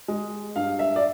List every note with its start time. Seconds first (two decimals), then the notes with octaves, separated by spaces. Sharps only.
0.08 G#3
0.56 G2 F5
0.79 E5
0.96 D5